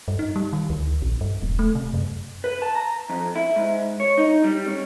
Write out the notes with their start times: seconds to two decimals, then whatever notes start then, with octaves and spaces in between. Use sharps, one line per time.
0.08 G2
0.19 D#4
0.36 G3
0.53 D#3
0.70 D2
1.02 A#1
1.21 G2
1.43 D#1
1.59 A3
1.75 C3
1.94 F#2
2.44 B4
2.62 A5
2.75 A#5
3.09 F2
3.36 E4
3.56 G#2
4.00 C#5
4.18 D#4
4.44 G3
4.68 C#4